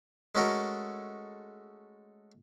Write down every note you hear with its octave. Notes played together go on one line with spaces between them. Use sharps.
G#3 A3 C#4 F#4 A4 A#4